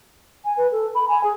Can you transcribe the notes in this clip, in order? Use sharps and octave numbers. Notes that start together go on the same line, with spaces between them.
G#5
B4
A4
B5
G#5
G#4